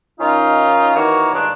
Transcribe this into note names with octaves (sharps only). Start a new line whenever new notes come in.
D#3 C#4 D#4 F4
D#3 E3 A#3 F#4 C#5
G2 A#2 D#3 G#3 D4